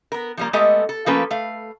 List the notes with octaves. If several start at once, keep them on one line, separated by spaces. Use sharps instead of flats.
B3 A#4
F3 G3 A#3
G#3 A3 B3 G4 A4 D#5
A4
F3 A3 A#3 C#4 A4 B4
A3 F5